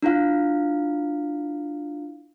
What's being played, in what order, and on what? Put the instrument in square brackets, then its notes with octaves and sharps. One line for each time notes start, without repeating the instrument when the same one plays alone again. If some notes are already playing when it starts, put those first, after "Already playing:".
[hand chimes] D4 E4 F4 F5